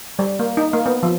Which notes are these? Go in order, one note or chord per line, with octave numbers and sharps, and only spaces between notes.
G3
A#3
D#4
A#3
B3
F3